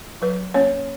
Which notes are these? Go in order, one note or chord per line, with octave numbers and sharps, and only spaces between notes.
F#3 B4
A#3 C#4 C#5